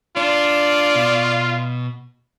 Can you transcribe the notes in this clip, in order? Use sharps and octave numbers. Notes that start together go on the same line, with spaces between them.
D4 F4 D5
B2